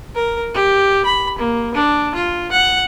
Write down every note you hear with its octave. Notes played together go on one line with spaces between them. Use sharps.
A#4
G4
B5
A#3
D4
F4
F#5